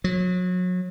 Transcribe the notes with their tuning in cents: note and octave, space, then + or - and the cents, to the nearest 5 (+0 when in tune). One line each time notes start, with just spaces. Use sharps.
F#3 -30